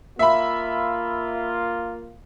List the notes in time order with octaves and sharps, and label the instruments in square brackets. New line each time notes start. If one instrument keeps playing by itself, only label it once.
[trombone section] A#3 F4 [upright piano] E5 B5